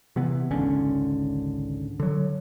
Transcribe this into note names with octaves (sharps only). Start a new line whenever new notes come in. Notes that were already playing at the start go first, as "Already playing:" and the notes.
C3 E3 B3
G#1 C#2 D3 C#4
D3 F#3